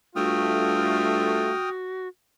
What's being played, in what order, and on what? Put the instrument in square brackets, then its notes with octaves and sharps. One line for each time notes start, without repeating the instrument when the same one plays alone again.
[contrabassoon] G2 [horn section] A3 F4 [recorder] F#4 [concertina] G5 D#6 F6